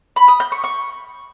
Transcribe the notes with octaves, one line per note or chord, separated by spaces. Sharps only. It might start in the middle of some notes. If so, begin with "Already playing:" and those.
B5
D#6
G6
C#6
C#6